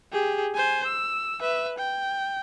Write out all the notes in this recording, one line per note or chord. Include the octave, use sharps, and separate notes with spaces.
G4 G#4
C5 G#5
E6
B4 E5
G5